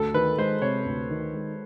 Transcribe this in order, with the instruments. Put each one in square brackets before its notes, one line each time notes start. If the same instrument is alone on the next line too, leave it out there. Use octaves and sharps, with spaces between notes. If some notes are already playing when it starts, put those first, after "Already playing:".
Already playing: [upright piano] D2 [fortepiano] A4
[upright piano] D#3 [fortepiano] B4
[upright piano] G#3 [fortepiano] C5
[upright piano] C3 [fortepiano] C#5
[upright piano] D2
D#3
G#3